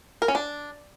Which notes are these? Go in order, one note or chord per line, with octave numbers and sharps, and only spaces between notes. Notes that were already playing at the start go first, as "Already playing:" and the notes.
A#4
C#4
D4